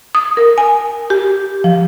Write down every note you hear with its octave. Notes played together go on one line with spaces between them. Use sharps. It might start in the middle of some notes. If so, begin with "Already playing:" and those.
D#6
A#4
G#5
G4
F3